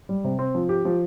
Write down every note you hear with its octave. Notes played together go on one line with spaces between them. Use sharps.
G3
C3
C4
F3
G4
F3